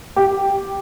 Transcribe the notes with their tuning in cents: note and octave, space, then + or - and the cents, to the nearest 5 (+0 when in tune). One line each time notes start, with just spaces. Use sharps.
G4 +5